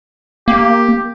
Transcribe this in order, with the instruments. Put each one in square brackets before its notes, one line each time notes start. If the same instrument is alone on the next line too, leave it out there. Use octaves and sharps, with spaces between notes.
[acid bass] A#3 [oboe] G4